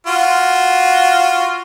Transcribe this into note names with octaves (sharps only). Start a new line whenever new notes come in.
F4 F#4